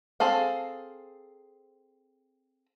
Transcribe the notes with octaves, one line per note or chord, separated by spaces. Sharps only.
C4 G#4 A4 F5